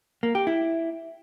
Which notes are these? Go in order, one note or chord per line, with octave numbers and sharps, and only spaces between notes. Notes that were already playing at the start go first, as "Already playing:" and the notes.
A#3
G4
E4